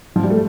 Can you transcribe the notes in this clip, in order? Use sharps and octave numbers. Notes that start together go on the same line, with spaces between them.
F3
G3
A3